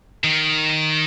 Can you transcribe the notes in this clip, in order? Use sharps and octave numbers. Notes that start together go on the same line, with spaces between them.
D#3